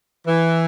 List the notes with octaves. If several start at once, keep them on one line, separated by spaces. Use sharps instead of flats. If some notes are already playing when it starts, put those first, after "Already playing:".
E3